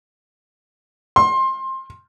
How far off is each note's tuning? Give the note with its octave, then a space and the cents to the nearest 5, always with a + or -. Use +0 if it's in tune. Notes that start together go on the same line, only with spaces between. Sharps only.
C6 +20